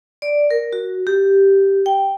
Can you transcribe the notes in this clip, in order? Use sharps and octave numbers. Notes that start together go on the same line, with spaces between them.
D5
A#4
F#4
G4
G5